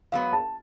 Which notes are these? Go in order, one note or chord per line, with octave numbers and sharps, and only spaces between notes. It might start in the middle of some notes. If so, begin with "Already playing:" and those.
G#2 F#3 B3 F5
A5